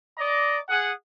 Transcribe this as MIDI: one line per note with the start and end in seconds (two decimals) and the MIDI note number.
0.18 0.58 74
0.18 0.58 75
0.18 0.58 82
0.18 0.58 86
0.69 0.91 68
0.69 0.91 78